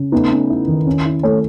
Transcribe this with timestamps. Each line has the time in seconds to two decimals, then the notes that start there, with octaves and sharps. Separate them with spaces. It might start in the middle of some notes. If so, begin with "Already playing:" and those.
Already playing: C#3
0.12 A3 B3 D#4
0.30 C#4
0.50 E4
0.68 D#3
0.87 C#4
1.05 E4
1.23 A3 C#4 A4